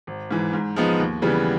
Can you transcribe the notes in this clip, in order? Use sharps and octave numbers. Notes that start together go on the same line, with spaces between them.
G#1
G#2 E3
G#2
F3 G#3 B3 D#4
D#2
C#3 E3 G3 B3